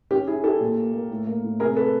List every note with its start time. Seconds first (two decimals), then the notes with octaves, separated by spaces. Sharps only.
0.11 C#4 G4
0.28 E4 G#4
0.43 E4 G4 A4
0.61 A#2
0.77 A#3
0.93 A#3
1.10 A2
1.27 A#3
1.44 A2
1.60 C3 G#4 A#4
1.77 A4 B4